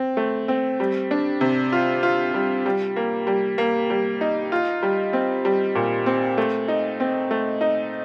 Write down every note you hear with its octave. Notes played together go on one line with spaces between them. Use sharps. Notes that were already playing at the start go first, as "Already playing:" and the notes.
Already playing: C4
A3
C4
G3
D4
C3
F4
F4
G3
G3
A#3
G3
A#3
G3
D#4
F4
G3
C4
G3
A#2
C4
A3
D#4
C4
A3
D#4